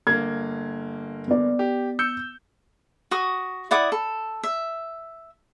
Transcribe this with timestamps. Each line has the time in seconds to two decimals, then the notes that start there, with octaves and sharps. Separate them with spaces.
0.07 G1 A#3 G#6
1.28 B3 D5
1.59 G4
1.99 E6 G6 C#7
3.11 F#4 C#6 D#6
3.71 E4 D5 F#5 D#6
3.92 A4
4.44 E5